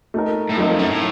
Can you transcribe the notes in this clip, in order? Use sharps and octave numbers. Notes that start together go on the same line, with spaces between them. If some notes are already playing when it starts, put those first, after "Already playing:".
A3 D#4 A#4
A2
F#2 A3 D#4 A#4
F2
F#2
A2